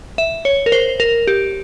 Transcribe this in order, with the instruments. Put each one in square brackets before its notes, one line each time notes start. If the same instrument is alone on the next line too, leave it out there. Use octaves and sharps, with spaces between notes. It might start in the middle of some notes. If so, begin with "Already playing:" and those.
[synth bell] E5
C#5
A#4
C5
A#4
G4